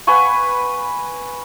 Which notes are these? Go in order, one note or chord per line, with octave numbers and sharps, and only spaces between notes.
B4 F#5 G#5 C#6